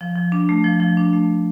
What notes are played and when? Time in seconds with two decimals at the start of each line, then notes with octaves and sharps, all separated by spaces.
0.01 F3
0.16 F3
0.32 D4
0.49 A3
0.64 F3
0.80 F3
0.97 D4
1.13 A3